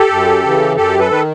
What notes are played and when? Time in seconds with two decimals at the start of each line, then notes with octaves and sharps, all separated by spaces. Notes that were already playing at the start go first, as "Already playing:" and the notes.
Already playing: G4 A4
0.10 F#2
0.43 C#3 E3
0.77 F#2 G4 A4
0.99 A4 B4
1.10 D#3 B4